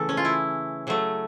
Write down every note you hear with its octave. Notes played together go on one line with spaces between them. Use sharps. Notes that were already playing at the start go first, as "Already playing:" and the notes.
Already playing: C#3 E3 A3 A4
C#4
F4
E4
C#3 F#3 A3